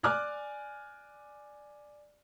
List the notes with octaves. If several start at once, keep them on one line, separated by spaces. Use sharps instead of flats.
D5 G#5 D6 F6 F#6